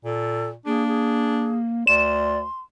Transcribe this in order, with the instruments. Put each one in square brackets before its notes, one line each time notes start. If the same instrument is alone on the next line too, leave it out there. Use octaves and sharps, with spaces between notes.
[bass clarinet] A#2 [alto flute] A4
[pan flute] A#3 [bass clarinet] D4 [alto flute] G#4
[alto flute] G#4
[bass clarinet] D2 [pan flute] D5 [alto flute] C6 [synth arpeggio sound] E7